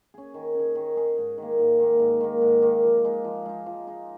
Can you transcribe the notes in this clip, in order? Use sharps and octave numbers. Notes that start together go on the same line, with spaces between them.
C#4 G#4
D#3
C#4 G#4
D#3
C#4 G#4
G#2
D#3 A#3
G#2
D#3 A#3
G#2
D#3 A#3
G#2
D#3 A#3
F3
G#3 D#4
F3
G#3 D#4
F3
G#3 D#4